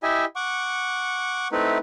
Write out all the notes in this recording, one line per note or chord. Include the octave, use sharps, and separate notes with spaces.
E4 G4 D#5 E5 G#5
F#5 C#6 D6
A3 C4 D#4 E4 B4